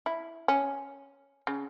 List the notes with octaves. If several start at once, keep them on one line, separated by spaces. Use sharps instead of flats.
E4
C#4
C#3